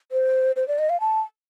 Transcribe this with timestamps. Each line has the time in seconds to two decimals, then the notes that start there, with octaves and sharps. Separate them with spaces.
0.12 C5
0.56 C5
0.68 D5
0.79 D#5
0.90 F5
1.00 A5